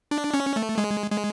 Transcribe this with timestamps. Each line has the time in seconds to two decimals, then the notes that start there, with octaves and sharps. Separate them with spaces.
0.11 D4
0.34 C#4
0.56 A3
0.78 G#3
1.11 G#3